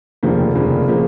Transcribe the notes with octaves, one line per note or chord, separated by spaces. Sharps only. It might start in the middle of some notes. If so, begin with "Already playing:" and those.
F1 D#2 C#3 F3 A#3
F1 D#2 C#3 F3 A#3
C#3 F3 A#3